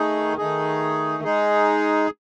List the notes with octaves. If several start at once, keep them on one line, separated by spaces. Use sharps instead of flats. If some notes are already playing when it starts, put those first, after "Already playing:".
Already playing: D#3 A3 D#4 G#4
D#3 A3 D#4 G#4
G#3 D#4 G#4